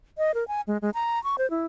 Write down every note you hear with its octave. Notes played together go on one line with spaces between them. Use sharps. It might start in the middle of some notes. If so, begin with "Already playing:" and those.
D#5
A#4
G#5
G#3
G#3
A#5
C#6
C5
E4